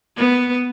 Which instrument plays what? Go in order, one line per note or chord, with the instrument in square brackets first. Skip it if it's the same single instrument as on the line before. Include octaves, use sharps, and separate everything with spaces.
[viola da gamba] B3